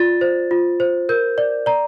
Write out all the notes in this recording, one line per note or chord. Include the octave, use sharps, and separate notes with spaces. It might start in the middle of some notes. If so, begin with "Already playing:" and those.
Already playing: F4 D5 A6
C5
F4
C5
A#4 G6
D5
D5 A#5